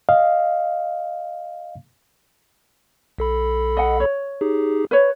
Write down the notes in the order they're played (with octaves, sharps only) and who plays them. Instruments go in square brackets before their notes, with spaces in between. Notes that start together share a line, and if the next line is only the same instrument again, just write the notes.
[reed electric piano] D#5 F5
[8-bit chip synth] B1 A4 B5
[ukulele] D#5 F#5
C#5
[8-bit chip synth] D#4 G4 G#4
[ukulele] B4 C#5